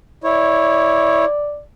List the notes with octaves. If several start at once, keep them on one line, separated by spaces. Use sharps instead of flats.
E4 C#5 D5